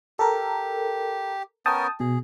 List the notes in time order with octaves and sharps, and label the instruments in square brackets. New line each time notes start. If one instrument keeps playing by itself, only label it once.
[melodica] G4 [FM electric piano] A4 A#4
[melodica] B3 C#4 A#4 [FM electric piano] G5 A5 D#6
[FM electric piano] B2 [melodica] G#4